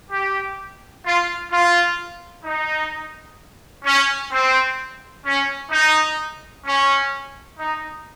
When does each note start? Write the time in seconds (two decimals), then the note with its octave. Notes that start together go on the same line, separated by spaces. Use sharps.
0.11 G4
1.05 F4
1.51 F4
2.44 D#4
3.85 C#4
4.32 C4
5.25 C#4
5.71 D#4
6.66 C#4
7.59 D#4